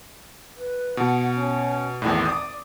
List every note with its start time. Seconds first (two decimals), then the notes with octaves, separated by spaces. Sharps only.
0.57 B4
0.97 B2 F#5
1.36 C#4
2.02 G#1 E2 A2 D5
2.26 D6 D#6